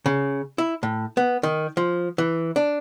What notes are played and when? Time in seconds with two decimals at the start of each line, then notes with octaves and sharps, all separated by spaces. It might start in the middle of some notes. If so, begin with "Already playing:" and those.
0.06 C#3
0.58 E4
0.83 A2
1.17 B3
1.43 D#3
1.77 F3
2.18 E3
2.56 D4